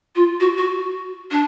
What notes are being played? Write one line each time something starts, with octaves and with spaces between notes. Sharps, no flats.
F4
F#4
F#4
D4